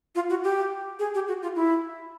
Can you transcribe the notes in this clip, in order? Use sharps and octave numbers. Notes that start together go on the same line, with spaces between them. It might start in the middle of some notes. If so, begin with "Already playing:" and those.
F4
F#4
G4
G#4
G4
F#4
F4
E4